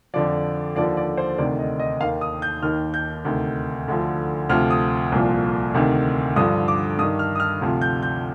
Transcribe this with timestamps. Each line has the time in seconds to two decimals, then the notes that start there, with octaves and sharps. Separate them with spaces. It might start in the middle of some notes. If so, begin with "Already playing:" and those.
0.14 F2 D3 F3 D5
0.76 D#2 D3 F3 D5
0.97 D5
1.18 C5
1.38 D2 C3 D#3 D5
1.59 D#5
1.80 D#5
2.01 D#2 D#3 F5
2.21 D#6
2.42 G6
2.62 D#2 D#3 F6
2.94 G6
3.25 D2 C3 D#3
3.88 D2 D3 F3
4.49 D2 C3 F3 F6
4.70 D#6
5.12 C2 A#2 F3
5.74 D2 C3 D#3
6.36 G2 D3 F3 D#6
6.68 D6
6.99 G2 D#6
7.02 D#3
7.19 F6
7.35 D#6
7.40 F6
7.61 D2 C3 F3
7.82 G6
8.03 G6